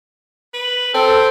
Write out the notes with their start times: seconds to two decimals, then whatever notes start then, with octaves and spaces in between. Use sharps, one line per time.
0.54 B4
0.94 C4 A4